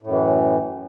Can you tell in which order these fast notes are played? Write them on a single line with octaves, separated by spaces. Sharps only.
A2 F#2 E3